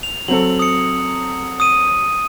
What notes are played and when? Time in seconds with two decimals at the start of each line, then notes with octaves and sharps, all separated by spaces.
0.03 F7
0.28 F#3 C4 A4 F#7
0.59 D#6 C#7
1.60 D#6 D#7